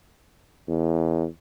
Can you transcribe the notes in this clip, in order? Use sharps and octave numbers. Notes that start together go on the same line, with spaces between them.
E2